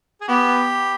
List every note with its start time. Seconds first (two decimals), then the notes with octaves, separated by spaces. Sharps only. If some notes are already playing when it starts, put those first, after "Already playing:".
0.21 G#4
0.28 B3 G4